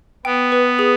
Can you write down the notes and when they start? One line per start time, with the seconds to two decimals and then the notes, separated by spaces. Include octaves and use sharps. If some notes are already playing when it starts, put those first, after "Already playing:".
0.25 B3 G5
0.52 B4
0.79 G#4